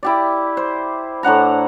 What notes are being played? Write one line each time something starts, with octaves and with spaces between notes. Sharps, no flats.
E4 G4 D5
C5
A2 D4 F#5 A#5